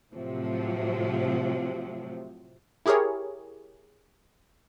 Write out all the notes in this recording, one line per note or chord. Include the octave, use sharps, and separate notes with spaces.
A2 C3 F3 F#3
E4 G4 G#4 A#4 C#5